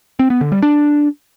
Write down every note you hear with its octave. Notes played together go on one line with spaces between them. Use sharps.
C4
B3
D3
G3
D4